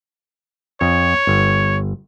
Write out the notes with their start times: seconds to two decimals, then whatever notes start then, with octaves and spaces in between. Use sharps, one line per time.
0.81 F2 C#5
1.27 G1